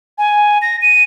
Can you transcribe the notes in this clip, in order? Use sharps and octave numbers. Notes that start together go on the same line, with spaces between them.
G#5
A#6
D#7